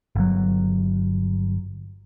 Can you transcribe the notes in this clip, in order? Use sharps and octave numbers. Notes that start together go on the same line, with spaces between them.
G1 F#3